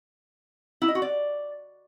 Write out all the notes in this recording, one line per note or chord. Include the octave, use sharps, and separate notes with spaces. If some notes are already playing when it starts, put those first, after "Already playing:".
E4
D#5
F#4
D5